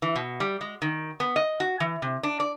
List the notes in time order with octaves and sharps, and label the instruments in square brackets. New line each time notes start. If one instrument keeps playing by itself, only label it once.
[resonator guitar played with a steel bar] E3
B2
G3
G#3
D#3
B3
D#5
F#4
E3
C3
D4
D5